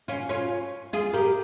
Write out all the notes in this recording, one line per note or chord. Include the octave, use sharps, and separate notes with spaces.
C#4 F4
C#4 F4
F4 G#4
G4 A#4